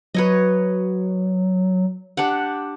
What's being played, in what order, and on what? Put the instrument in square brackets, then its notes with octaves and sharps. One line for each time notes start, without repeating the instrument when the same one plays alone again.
[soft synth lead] F#3 [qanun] B4 C#5 D#5
[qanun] D4 G4 F#5